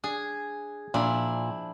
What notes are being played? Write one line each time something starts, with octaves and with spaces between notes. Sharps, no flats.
D4 G#4
A#2 F3 D4 E4